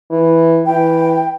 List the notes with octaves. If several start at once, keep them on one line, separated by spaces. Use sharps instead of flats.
E3
E3 G5